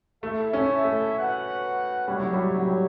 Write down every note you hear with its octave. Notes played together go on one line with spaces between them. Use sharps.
A3 E4 A4 E5
C#4
A3
F#4 B4 F#5
G3 E4 G4 C#5
F#3
G3
F#3
G3